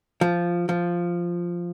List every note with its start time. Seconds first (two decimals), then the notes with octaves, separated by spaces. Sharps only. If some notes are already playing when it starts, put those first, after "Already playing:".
0.21 F3
0.69 F3